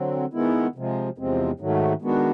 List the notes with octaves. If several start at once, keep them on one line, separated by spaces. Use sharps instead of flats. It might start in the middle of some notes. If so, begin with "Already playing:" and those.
Already playing: D3 F#3 C4
D#3 G#3 B3 E4
C3 F3 G#3
E2 C3 F3 G#3 C4
G#2 D#3 F#3 A3
D#3 G#3 B3 D4 F#4